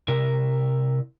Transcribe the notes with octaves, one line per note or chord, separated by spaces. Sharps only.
C3 E4 A#4